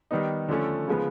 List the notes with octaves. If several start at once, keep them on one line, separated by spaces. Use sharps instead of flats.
D#3 G3 B3 D#4
D3 F3 A3 C#4
C#3 F3 G#3 B3